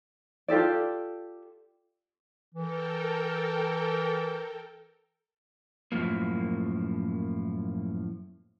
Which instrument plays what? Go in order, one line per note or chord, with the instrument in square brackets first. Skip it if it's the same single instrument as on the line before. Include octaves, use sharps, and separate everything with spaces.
[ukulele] F4 G4 A4 D5
[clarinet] E3 [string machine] A4 A#4 G5
[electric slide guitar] F#2 A2 C3 F3 A#3